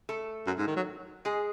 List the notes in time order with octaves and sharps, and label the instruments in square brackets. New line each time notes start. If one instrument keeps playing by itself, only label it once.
[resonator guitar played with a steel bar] A3 A4
[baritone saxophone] F#2
G#2
D#3
F#3
[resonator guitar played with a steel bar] G#3 G#4